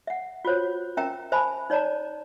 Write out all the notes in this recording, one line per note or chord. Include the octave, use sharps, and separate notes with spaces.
E5 F#5
F4 F#4 C5 C#5
C#4 A#4 E5 G5 A#5
C5 E5 G#5 A5 B5
D#4 C#5 D5 A5 A#5